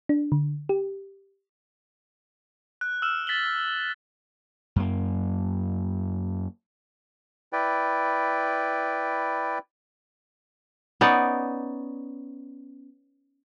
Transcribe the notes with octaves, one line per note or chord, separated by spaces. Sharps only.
D4
D3
G4
F#6
E6 F6 E7
A6 B6 E7 F#7 G7
F#2 A#3
E4 B4 D5 G5
B3 C#4 D#4 D5